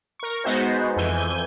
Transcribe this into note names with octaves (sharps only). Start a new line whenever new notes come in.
A#4 C#6
G#3 B3 D#4 F#4 C5
F2 E3 G#5 G6